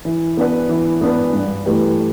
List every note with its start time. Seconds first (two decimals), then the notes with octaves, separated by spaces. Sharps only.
0.05 E3
0.37 B3 D4 B4
0.69 E3
1.01 B3 D4 B4
1.33 G2
1.66 E3 A3 G4 B4